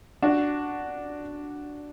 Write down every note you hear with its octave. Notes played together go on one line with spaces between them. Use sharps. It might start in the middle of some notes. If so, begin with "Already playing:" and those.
D4 F#4